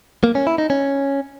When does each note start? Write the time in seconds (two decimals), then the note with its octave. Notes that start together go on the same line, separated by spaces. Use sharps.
0.24 A#3
0.35 C#4
0.47 E4
0.58 D#4
0.70 C#4